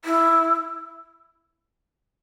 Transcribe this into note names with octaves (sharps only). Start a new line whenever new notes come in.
E4